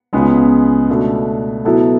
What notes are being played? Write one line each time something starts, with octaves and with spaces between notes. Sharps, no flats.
C#2 C#3 G#3 B3
B2 A3 D4
B2 F#3 B3 E4 A4